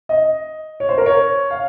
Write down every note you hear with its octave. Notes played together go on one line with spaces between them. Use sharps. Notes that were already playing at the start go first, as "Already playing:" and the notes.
D#5
C#5
C5
A#4
C#5
F5